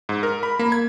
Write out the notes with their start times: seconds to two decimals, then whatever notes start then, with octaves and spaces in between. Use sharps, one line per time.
0.09 G#2
0.23 A#4
0.43 B5
0.59 A#3
0.72 G#6